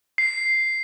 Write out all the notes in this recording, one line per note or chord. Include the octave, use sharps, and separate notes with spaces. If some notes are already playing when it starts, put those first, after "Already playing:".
C7